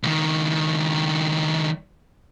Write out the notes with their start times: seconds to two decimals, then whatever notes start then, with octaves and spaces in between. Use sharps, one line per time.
0.03 C#2 D#3